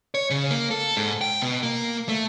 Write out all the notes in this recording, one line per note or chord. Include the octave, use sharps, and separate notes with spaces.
C#5
C#3
A#3
A4
G#2
G5
B2
A#3
A3